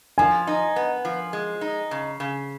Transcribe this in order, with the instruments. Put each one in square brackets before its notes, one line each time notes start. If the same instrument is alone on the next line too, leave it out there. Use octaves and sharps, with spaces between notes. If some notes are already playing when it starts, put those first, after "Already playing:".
[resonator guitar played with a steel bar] F3 [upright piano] G#5
[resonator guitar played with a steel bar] D#4
B3
F3
G#3
D#4
C#3
C#3